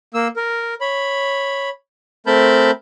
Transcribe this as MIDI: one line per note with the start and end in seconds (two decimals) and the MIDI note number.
0.14 0.28 58
0.14 0.28 88
0.36 0.74 70
0.81 1.70 73
0.81 1.70 83
2.26 2.71 57
2.26 2.71 60
2.26 2.71 70
2.26 2.71 81
2.26 2.71 83
2.26 2.71 91